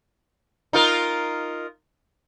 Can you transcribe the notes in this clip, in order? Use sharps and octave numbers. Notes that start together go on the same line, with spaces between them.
D#4 F4 A#4